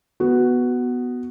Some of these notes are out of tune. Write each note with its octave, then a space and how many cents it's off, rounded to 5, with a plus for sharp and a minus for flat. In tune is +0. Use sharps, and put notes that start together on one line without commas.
B3 +0 F#4 +5